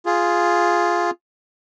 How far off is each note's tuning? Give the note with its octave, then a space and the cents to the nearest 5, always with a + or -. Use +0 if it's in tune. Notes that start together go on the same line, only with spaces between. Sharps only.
F4 +0 G#4 +0